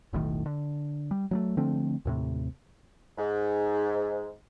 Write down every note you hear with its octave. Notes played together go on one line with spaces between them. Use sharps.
E1 B1 A2 D#3
D3
G3
F#3 G#3 A3
D3 F3 A3 C4
D#2 A2 C3
G#2